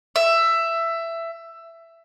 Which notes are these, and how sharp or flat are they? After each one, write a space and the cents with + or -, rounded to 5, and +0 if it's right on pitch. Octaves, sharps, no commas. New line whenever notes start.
E5 +15